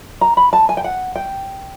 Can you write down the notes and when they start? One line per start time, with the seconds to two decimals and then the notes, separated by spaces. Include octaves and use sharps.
0.21 A#5
0.37 B5
0.53 A5
0.69 G#5
0.77 G5
0.84 F#5
1.16 G5